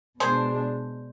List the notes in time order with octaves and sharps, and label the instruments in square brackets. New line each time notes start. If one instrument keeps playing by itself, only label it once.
[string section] B2 G#3 D4 [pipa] G#4 C5